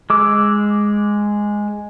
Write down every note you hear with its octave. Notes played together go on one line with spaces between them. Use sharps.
G#3 D6 E6